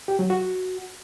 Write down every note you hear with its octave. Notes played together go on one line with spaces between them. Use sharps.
G4
F#3
F#4